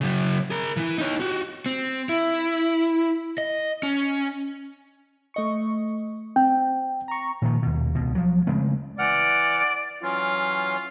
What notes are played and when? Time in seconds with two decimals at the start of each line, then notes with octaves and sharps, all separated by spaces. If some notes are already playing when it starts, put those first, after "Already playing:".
0.01 C#3 F#3
0.50 G#4 A#4
0.77 E3 E4
0.98 D#4 C#5
1.20 F#4 G4
1.66 C4
2.09 E4
3.38 D#5
3.83 C#4
5.34 A3 D#5 C#6
6.36 C4 G5
7.08 A#5 C#6
7.42 A#2 D#3 F3
7.62 D#2 B2
7.95 C#2 B2
8.15 F3 F#3
8.47 C#3 G#3 A3 C4
8.99 E3 D5 F#5 F6
10.03 E3 F#3 C#4 F4